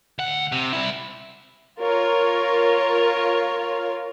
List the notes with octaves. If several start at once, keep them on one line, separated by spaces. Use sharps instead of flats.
D2 F#5
C3
C2 E4
F4 A#4 C#5